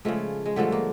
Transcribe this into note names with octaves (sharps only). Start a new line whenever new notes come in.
C#3 F3 G#3 A3
G#3
G2 D3 F3 G#3 A3
A#3